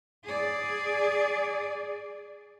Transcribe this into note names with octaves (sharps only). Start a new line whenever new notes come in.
G#4 D5